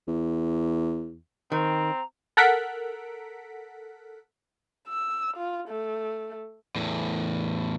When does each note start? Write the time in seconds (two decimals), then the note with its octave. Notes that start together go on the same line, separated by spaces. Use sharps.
0.08 E2
1.52 D#3 C4 A#5
2.37 A4 A#4 F#5 B6 D7
4.88 E6
5.37 F4
5.68 A3
6.75 E2 A2